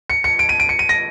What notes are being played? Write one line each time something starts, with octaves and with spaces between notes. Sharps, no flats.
C#7
C#7
D7
D#7
D7
C#7
D#7
A#6